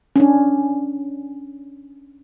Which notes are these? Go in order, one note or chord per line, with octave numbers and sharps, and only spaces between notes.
C#4 D4